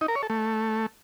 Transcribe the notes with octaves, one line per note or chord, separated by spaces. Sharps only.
D#4
A#4
C#5
A4
A3